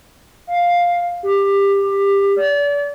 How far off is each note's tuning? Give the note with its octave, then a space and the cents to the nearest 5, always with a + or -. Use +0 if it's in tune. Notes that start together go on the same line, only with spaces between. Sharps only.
F5 +5
G4 +20
D5 -35